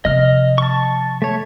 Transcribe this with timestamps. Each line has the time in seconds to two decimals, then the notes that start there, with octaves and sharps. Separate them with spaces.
0.05 C3 F3 D#5 F6
0.58 A5 C#6
1.22 A3 C#5